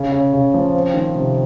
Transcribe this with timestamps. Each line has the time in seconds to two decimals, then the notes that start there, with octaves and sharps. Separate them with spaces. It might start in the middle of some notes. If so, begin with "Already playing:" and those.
Already playing: C#3
0.12 C#3
0.33 C#3
0.54 F3
0.74 C4
0.94 D#3
1.15 C3